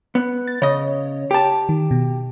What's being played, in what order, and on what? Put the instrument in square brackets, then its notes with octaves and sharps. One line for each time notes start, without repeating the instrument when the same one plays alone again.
[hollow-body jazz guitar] B3
[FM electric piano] A6
[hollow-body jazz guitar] C#3 D#5 [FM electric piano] C#5
[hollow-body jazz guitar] G4 A5
[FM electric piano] D#3
B2